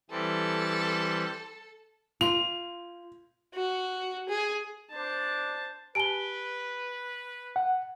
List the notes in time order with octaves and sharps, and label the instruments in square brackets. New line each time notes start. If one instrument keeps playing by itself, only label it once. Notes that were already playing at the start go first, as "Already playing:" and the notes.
[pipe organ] E3 G3 C4 [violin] A4
[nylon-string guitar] F4 [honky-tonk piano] F7
[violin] F#4
G#4
[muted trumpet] D4 [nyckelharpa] C5 A5
[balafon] G4 G#5 A5 [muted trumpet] B4 [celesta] D7 G7
[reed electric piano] F#5